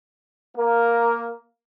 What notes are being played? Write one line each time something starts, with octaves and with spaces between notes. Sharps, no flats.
A#3 A#4